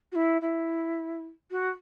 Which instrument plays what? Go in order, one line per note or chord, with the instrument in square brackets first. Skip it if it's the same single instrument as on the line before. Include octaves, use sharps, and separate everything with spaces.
[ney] F#4
E4
E4
F#4